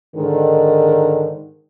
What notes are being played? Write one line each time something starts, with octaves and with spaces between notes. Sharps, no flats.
G#2 D3 D#3